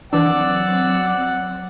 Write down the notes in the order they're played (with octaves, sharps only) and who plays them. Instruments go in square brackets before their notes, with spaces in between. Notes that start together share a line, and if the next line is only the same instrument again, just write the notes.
[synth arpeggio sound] E3 D4 [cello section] F#3 C4 [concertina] D5 E6 [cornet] F#5